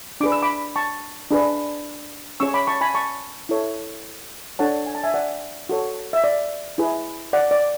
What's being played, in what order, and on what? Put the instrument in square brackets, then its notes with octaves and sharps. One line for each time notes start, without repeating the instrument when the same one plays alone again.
[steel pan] D4 G#4 B4 D6
E6
B5 D6
A5 C#6
D4 G#4 B4
C#4 G#4 C#5 C#6 E6
B5 D6
A5 C#6
G#5 B5
A5 C#6
E4 A4 C#5
D4 A4 C#5 F#5 A5
G#5
A5
E5 G#5
D5 F#5
F#4 A4 C#5
E5
D5
E4 G#4 B4
D5 F#5
D5